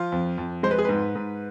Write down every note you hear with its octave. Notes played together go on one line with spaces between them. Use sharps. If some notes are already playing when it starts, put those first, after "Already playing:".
Already playing: F3 F4
F2
F2
G#3 C5
B4
G#4
G#2 B4
G#2